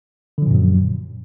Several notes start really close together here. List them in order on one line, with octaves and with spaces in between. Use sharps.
D3 F3 A#2 F#2 F#3